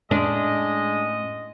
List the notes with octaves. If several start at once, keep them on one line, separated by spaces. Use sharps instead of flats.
A2 G#3 C#4 D4 D#5